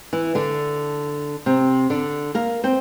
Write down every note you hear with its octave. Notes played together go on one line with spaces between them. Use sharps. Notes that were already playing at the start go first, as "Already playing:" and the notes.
E3 E4
D3 D4
C3 C4
D3 D4
A#3 A#4
C4 C5